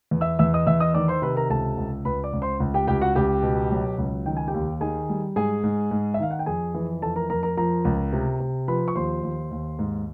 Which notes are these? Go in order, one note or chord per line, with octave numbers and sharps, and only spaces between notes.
E2
E5 E6
E2 E5 E6
D#5 D#6
E2 E5 E6
D#5 D#6
D#3 D5 D6
C5 C6
C3 B4 B5
A#4 A#5
C#2 A4 A5
C#2
C#2 B4 B5
D5 D6
C#2
C5 C6
C#2
G4 G5
C#2 G4 G5
F#4 F#5
C#2 G4 G5
B2
F#3
C#2
D#3 G5
G#5
G4 G5
D#2
D#3 G#4 G#5
G3
G#2 G#4 G#5
G#2
G#2
E5
D#3 F5
F#5
G5
F2 G#4 G#5
E3
F2 A4 A5
A#4 A#5
F2 A#4 A#5
A#4 A#5
F3 A#4 A#5
C#2
C3
C3
F3 B4 B5
C#6
D#2 C5 C6
D#2
D#2
G#2